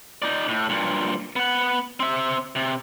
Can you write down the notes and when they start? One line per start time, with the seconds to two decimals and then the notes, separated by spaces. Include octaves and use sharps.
0.22 D#4 D5
0.48 A2
0.69 G2 A#2
1.36 B3 F#5
2.00 C4 E5
2.55 C3